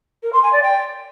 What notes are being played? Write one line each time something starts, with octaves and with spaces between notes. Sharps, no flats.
A#4
C6
G#5
D5
G5